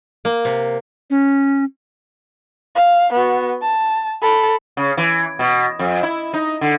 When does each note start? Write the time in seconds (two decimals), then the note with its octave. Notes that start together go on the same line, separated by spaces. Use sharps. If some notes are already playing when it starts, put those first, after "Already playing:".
0.25 A#3
0.45 C3
1.10 C#4
2.75 F5
3.12 B3 F#4
3.62 A5
4.21 A4 B5
4.77 C#3
4.97 E3
5.39 B2
5.79 F2
6.03 E4
6.34 D#4
6.61 D3